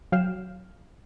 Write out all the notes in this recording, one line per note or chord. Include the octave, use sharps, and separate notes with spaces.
F#3 F5 G5 F6 C7 E7